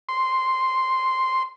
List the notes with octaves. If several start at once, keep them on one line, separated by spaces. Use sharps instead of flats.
C6